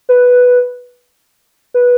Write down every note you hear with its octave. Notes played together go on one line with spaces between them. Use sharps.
B4
B4